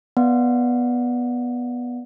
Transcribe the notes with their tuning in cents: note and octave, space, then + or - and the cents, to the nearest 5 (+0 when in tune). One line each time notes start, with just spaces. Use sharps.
B3 -10 D5 +0 F#5 -15